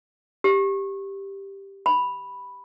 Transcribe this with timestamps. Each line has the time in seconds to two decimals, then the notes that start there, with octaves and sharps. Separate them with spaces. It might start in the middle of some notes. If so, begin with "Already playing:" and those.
0.44 G4
1.86 B5